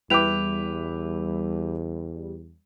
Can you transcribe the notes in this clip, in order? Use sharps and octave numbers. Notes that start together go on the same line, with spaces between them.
E2 G3 E4 B4 G5 D6 F7